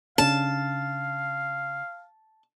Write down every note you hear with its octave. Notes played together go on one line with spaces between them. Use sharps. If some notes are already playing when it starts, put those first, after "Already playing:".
C#3 C#4 D4 F5 A5